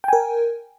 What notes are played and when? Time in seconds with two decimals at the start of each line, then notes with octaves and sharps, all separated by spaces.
0.04 G5
0.08 G#5
0.13 A#4